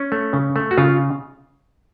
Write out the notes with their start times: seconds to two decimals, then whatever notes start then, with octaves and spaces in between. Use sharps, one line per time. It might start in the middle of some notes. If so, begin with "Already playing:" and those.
Already playing: C#4
0.12 A3
0.33 C#3
0.56 A3
0.71 F#4
0.78 C#3 F4